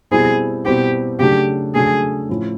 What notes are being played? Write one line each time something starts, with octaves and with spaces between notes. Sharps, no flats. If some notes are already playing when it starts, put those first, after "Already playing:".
B2 G3 C4 E4 G#4
B2 G3 C4 E4 G4
C#3 F#3 A3 D4 G4
C#3 F#3 A3 D4 G#4
A2 F3 A3 C#4 E4